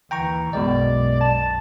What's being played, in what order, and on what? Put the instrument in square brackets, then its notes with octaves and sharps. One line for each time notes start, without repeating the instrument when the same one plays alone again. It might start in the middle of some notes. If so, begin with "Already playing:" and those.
[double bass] D#2 E3 [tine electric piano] G5 A#5 C#6
[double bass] B1 F#2 [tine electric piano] B2 G#3 D#5 [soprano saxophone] D5
[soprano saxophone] A5